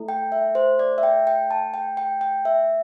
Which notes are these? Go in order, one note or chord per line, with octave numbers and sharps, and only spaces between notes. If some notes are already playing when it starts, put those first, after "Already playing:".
Already playing: A3 E4 A4
G5
E5
C5
D5
E5
G5
G5
A5
G5
G5
G5
E5